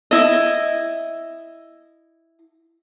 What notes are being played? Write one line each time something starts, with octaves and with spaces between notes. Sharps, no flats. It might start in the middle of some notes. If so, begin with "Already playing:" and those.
E4 D#5